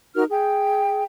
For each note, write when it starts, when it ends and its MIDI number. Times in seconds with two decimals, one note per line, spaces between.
0.15 0.24 63
0.15 0.24 66
0.15 0.24 70
0.15 0.24 89
0.30 1.03 68
0.30 1.03 79